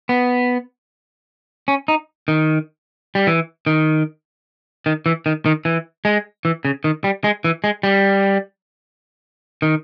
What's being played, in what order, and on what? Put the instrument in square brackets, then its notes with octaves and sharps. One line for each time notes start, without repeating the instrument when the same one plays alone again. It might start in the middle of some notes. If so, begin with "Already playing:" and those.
[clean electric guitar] B3
C#4
D#4
D#3
G3
E3
D#3
D#3
E3
D#3
D#3
E3
G#3
E3
C#3
D#3
G3
G#3
E3
G#3
G3
D#3